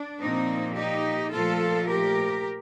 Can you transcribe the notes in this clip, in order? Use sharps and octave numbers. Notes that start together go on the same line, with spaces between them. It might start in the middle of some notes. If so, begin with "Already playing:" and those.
Already playing: D4
A#2 F3 A#3 C4 D#4
D#4 G4
A#2 F3 A3 F4 A4
G4 A#4